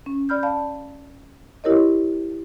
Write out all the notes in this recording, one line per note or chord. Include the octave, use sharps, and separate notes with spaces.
C#4
D5 B5 F6 G6
D5 F5 A5 B5
E4 G4 A#4 C#5 D#5